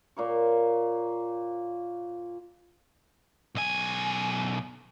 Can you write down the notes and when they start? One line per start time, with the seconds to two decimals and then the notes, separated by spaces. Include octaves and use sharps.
0.17 A#2 A#3 C#5
3.55 B1 G#5